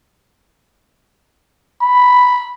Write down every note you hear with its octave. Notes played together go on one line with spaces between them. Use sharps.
B5